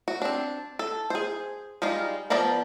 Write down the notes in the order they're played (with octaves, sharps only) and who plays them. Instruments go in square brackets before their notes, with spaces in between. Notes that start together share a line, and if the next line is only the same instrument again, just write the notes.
[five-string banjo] F#4
C4 D4
A4
G#4 C5
G3 G#3 D#4 F4
F3 B3 A#4 D5 A5